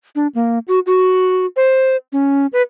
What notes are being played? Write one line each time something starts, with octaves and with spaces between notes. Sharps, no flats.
D4
A#3
F#4
F#4
C5
C#4
B4